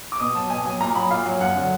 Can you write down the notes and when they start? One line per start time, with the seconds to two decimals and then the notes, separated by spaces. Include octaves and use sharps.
0.12 D6
0.20 B2 D#6
0.34 F#3 A5
0.50 B2 G#5
0.65 F#3 G#5
0.80 A#2 A#5
0.95 F#3 B5
1.11 A#2 F5
1.26 F#3
1.41 F#2 F#5
1.56 D3 F#3